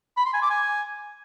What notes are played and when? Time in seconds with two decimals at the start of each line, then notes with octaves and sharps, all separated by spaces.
0.17 B5
0.25 C6
0.34 G#5
0.42 D6
0.50 G#5